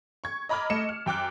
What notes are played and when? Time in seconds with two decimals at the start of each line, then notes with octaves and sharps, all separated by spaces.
0.24 C#6 G#6
0.49 D#5 A#5 B5 D6 F6 G#6
0.70 A3 D#5 C#7 E7
0.89 F6
1.06 F#2 G5 D6 F#6